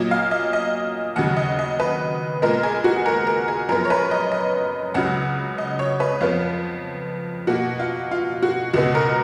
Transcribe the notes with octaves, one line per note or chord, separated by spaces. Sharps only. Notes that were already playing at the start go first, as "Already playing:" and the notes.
Already playing: A#2 F#3 A#3 D#5
F5
D#5
D#5
D#2 C#3 F#3 F#5
D#5
D#5
B4
A#2 G#3 B3 A#4
G#4
F#4
A#4
A#4
G#4
F#2 F3 B3 A#4
C#5
B4
D#5
D#5
C#2 C#3 F#3 F#5
D#5
C#5
B4
F2 F3 B3 F4
B2 A#3 F#4
F4
F4
F#4
C#2 B2 G#3 B3 F#4
A#4